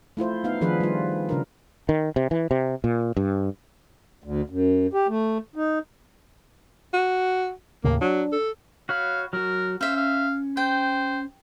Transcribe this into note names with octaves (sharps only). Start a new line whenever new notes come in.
A3 E4 F4 C5
B3 D#4 F5
D#3 F3 D4 G#4 B4
G3 F4
C#3 D4 A#4
D#3
C3
E3
C3
A#2
G2
D2
F#2
G4
A3
D#4
F#4
D#2 A2 C#3 A#3
F#3 D4
A4
F#4 C#5 F5 B5
F#3 F#4 A#4
C#4 C5 E5 F5
F5
C5 G5